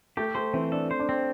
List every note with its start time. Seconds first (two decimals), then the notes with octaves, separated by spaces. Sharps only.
0.17 A3 G4
0.35 A3 C5
0.54 E3 C4
0.72 D4 A4
0.91 C5
1.00 D4
1.09 C4